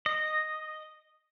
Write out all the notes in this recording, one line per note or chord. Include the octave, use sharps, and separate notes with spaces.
D#5